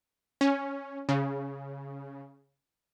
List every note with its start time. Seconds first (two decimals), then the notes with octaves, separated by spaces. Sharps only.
0.41 C#4
1.09 C#3